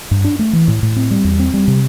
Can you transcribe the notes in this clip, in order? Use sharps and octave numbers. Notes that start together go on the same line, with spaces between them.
G2
D4
A3
E3
A2
A2
C4
G3
E2
C4
G3
C3